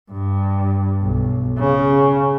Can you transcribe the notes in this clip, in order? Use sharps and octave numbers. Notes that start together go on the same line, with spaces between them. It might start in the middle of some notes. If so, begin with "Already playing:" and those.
G2
B1
C#3